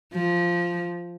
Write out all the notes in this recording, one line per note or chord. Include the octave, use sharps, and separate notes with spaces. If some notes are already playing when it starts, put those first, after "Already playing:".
F3